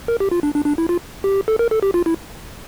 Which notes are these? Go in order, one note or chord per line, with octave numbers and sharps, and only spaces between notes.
A#4
G4
F4
D4
D4
D4
E4
F4
G4
A4
A#4
A4
G4
F4
E4